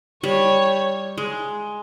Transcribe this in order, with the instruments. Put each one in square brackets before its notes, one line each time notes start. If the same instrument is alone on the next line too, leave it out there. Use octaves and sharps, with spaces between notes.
[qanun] G3 [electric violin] C#5
[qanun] G#3